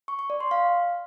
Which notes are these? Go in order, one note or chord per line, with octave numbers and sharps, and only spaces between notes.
C#6
C#6
D5
C6
F5